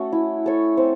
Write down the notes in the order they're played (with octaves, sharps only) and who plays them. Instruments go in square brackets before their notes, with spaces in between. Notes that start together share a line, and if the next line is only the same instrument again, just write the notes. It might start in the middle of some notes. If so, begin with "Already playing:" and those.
Already playing: [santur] A3 C#4 F#4 A4
E4
A4 C#5
C4